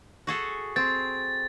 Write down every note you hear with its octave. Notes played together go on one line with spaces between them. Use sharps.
F#4 G#4 A4
C4 A6